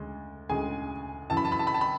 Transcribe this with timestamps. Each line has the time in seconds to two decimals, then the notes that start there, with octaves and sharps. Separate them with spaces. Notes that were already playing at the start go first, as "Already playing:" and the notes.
Already playing: D2 C#3 G#3
0.49 D2 C#3 G#3 G#4 G#5
1.30 F#2 C#3 E3 A5
1.37 B5
1.45 A5
1.52 B5
1.59 A5
1.67 B5
1.74 A5
1.81 B5